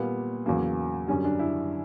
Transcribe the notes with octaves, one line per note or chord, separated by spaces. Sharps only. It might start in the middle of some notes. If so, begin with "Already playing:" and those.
Already playing: A#2 G3 A#3 B3
E2 C#3 F#3 A#3
F#2 D3 G3 C#4
D4
E4